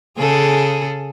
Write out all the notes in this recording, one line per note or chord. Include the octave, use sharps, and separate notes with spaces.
C#3 G#4 A4